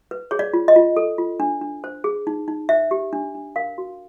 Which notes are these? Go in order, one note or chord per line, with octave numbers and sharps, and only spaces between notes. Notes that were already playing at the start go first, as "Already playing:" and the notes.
B4
G#4 C#5
D5
F4
D#5
F4
A4
F4
D4
D4
C5
G#4
D#4
D#4
C5 E5
G4
D4
D4
A#4 F5
F#4